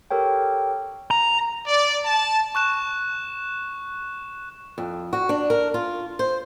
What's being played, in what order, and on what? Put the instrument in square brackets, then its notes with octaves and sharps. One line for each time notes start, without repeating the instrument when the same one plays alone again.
[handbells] G4 A4 A#4 C#5 G5
[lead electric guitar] A#5
[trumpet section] D5
A5
[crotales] C#6 F#6 E7
[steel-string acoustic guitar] F2
F#4
D4
A#4
F4
C5